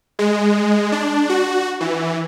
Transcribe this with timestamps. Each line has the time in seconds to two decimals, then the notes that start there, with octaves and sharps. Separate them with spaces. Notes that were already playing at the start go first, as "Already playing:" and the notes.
0.19 G#3
0.92 D4
1.29 F#4
1.80 E3